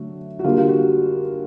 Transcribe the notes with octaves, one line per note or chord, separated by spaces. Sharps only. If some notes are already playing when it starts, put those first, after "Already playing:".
Already playing: D3 F#3 A3 F#4
F#4
D3 G3 A#3 F4
F4
F#4